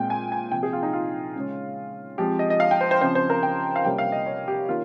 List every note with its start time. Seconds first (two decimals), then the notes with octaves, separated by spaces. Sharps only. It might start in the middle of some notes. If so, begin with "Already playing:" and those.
Already playing: A#2 G#3 C4 G5
0.10 G#5
0.32 G#5
0.51 C3 F3 C4 G5
0.63 G#4
0.73 F4
0.83 D#4
0.93 F4
1.36 C#3 G#3 C#4
2.18 F3 G#3 C4 G4
2.39 D#5
2.50 D#5
2.60 F5
2.71 G5
2.81 C5
2.91 C5
3.01 C#3 F3 C4 C5
3.15 C5
3.30 A#4
3.43 G5
3.76 F5
3.85 C3 G3 A#3 C#4 G5
3.98 F5
4.12 D#5
4.26 C#5
4.48 G4
4.69 D#3 A#3 C#4 F4